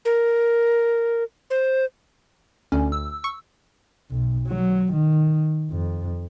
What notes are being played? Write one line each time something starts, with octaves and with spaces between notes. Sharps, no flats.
A#4
C5
D2 C#4
E6
C#6
B1
F#3
D#3
F2